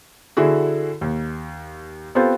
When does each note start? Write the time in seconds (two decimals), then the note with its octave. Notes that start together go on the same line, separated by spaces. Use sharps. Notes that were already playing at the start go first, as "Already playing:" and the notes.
0.37 D3 E4 F#4 G#4
1.01 D#2
2.15 B3 C4 F4 G4 A4 C5